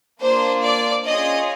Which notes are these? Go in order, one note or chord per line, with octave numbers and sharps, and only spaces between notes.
A#3 D4 F4 C5
D5
C#4 F4 G#4 D#5